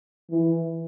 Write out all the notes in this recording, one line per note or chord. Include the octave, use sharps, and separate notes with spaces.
E3